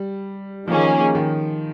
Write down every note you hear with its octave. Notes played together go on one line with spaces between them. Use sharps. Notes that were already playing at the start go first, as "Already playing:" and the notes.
Already playing: G3
D#3 F3 A#3 C#4 G#4
D#3